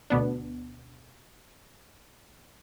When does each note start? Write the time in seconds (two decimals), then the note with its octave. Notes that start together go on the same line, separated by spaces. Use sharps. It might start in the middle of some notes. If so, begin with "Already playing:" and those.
0.10 D2 B2 B3 D4